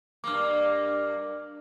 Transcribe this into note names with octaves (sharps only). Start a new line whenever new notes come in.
G2 A#3 D6 F6